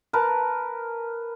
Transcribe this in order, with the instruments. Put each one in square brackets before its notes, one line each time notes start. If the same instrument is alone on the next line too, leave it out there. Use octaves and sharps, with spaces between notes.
[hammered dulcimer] A#4 B4 A5